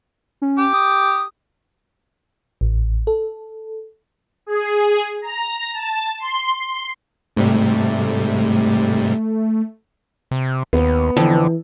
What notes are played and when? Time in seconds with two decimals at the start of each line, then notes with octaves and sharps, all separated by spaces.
0.42 C#4
0.58 G4
0.73 D#6
2.61 A1
3.07 A4
4.46 G#4
5.22 A#5
5.73 A5
6.20 C6
7.37 G#2 C3 G3 A3
10.31 C3
10.73 D#2 B3
11.17 F2 D3 E3